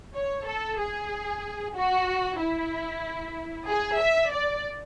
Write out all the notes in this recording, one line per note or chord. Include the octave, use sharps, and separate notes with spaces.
C#5
A4
G#4
F#4
E4
G#4
E5
D5